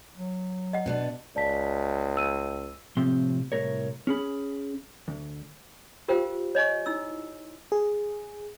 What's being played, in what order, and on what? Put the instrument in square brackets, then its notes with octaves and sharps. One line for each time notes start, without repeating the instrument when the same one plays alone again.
[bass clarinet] F#3
[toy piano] D#5 F#5
[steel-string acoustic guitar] B2 B3 D4
[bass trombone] C#2 [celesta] D5 A5 B6
[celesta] E6 D#7
[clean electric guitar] A2 C3 F3 C4 C6
C2 F#2 A2 A#4 C#5
C#4 G#4 B5
D2
[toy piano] F4 G4 A#4 C5 F5 G5
C#5 D#5 G#5 C#6
D#4 E4 E6
[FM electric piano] G#4